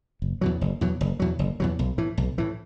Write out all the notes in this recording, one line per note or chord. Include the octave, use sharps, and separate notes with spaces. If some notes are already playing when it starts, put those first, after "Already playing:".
F#1
E2 B2 F#3
F#1
E2 B2 F#3
F#1
E2 B2 F#3
F#1
E2 B2 F#3
B1
A2 E3
B1
A2 E3